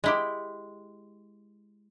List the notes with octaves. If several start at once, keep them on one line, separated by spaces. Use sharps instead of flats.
G#3 E4 G4